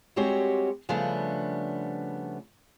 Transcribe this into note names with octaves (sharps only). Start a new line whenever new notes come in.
G3 G#3 C4 F#4 G4 C#5
C#3 F3 G3 A3 B3 D4